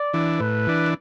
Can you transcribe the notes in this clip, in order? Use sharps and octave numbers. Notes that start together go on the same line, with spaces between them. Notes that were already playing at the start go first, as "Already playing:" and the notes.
Already playing: D5
E3 D4
A2 B4
E3 D4